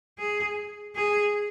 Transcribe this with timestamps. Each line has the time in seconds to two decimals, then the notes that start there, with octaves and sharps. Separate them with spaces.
0.19 G#4
0.96 G#4